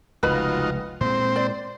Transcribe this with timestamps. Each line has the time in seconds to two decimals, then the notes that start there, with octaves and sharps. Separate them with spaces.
0.23 F1 C#2 D#4 F4 F#4 B4 D#5 B5
1.01 A#2 G#3 C4 C5
1.36 D5